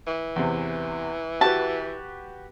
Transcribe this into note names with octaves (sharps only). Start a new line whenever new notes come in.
E3
E2 C3
F#4 G4 B4 A5